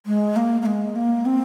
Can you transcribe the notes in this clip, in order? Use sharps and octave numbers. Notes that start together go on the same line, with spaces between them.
G#3
A#3
A#3
G#3
A#3
C4